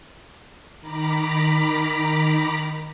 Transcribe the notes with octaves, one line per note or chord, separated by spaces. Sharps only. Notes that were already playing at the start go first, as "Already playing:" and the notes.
D#3 A#5 B5 D6 B6